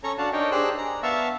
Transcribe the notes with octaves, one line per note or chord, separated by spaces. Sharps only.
C#4 A4 C#5 A#5 C#6
D4 F#4 F5 F#5 A5
D4 D#4 A#4 C#5 D#5 G5
D4 G4 G#4 C5 E6 F#6
A#5
B3 E5 F5 A5 C#6 E6